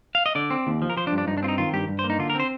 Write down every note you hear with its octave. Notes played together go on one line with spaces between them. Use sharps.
F5
D#5
D3 D5
C4
D#2
F3
A#4
F3 C5
D4
G2
D4
G2 D#4
D4
C4 F4
D#4
D#3 F4
G2 G4
G2
C5
A#3
D#4
D3 F4
A#4
C4 C5